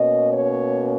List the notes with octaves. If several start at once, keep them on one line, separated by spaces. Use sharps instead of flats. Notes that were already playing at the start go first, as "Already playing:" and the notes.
Already playing: B2 A#3 C#4 D#5
C#5